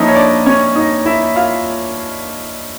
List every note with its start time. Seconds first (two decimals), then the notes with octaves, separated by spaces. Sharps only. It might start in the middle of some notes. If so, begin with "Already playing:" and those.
Already playing: F3 A#3 C#4 D#4 E4 D#5
0.08 C#5
0.16 D4 D5
0.46 C#4 C#5
0.75 D#4 D#5
1.06 E4 E5
1.36 F4 F5